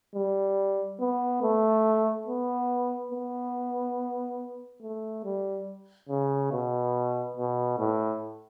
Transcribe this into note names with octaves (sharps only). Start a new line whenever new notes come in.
G3
B3
A3
B3
B3
A3
G3
C#3
B2
B2
A2